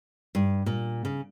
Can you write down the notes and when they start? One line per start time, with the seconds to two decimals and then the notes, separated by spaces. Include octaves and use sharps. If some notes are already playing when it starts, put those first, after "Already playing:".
0.35 G2
0.66 A#2
1.05 C#3